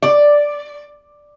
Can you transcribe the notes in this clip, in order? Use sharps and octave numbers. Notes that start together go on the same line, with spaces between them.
D5